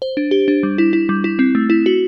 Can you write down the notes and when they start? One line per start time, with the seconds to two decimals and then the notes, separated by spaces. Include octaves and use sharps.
0.02 C5
0.17 D4
0.31 G4
0.48 D4
0.63 G3
0.78 E4
0.93 E4
1.09 G3
1.24 E4
1.39 C4
1.55 A3
1.70 E4
1.86 F#4